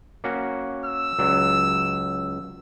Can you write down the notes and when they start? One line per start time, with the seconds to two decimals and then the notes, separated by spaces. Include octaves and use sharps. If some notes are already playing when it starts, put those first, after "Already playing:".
0.24 A#3 C#4 F#4
0.86 E6
1.19 C#2 F#3 D5